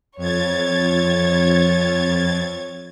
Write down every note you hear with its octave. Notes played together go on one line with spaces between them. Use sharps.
F2 C#5 G#6 A6